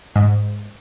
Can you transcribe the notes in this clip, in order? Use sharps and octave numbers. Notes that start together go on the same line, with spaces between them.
G#2